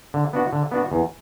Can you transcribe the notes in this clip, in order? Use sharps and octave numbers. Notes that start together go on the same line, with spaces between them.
D3
B3 D4 F#4
D3
B3 D4 F#4
E2